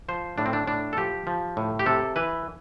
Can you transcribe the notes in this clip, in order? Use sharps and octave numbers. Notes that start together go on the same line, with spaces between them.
F3 C5
A2 D4
C4
D4
A2 D4
A4
F3 G4
F3
A2
G4
C3 A4
E3 B4